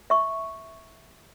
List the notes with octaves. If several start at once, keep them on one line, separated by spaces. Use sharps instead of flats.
E5 C#6